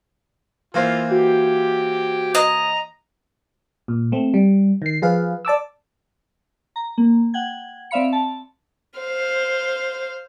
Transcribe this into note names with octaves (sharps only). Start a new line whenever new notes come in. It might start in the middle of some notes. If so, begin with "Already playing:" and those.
E3 A#3 F4 C5
F#4 G4
D#5 A#5
A#2
A3 C4
G3
D#3 C7
F3 G#4 B4 F5
D5 A5 D6 E6
A#5
A#3
F#5 G5 G#6
C4 D5 E5 F5 B5 C#7
A5
C5 F5